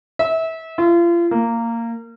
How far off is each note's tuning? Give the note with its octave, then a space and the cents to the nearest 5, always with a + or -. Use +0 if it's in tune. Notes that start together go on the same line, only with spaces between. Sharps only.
E5 -25
F4 -35
A#3 -15